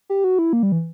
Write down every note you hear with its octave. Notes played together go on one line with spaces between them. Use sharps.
G4
F#4
E4
A#3
G3
E3